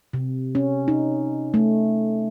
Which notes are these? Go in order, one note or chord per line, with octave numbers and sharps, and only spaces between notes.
C3
C#4
D#4
A3